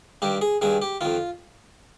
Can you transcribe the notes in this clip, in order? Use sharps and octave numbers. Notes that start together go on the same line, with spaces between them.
G2 D#3 G4
G#4
G2 D#3 G#4
G4
F2 D#3 F4